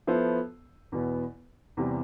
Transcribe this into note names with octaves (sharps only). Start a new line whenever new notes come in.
F3 B3 E4 A4 C5
E2 B2 B3
E2 C3 G3